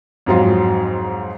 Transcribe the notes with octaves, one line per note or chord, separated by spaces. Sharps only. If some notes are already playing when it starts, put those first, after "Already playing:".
F2 G#2 F#3 F4